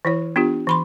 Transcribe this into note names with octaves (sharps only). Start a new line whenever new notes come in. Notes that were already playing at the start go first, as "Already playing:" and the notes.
E3 E4 C#5
B3 D4 F4 G4
E3 B5 C6